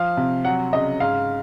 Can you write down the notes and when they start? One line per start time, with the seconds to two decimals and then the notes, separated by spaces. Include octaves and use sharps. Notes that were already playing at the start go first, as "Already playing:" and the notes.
Already playing: F3 F5
0.17 C3
0.45 F#3 F#5
0.73 C#3 D#5
1.00 G#2 F5